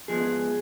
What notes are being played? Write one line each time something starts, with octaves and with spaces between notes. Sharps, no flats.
G#2 F3 G#3 B3 G#4